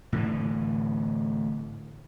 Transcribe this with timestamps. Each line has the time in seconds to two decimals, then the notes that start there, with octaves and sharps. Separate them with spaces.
0.13 A2 D3 E3